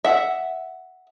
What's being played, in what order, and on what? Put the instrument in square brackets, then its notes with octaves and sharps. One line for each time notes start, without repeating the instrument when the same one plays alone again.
[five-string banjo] E5 F#5